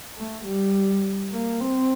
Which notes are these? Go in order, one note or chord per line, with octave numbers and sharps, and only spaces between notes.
A3
G3
A#3
C4